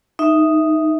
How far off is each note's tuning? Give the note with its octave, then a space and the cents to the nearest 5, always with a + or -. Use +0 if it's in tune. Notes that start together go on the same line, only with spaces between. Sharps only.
D#4 +0 E5 +0